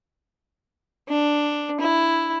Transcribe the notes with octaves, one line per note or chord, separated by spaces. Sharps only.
D4
E4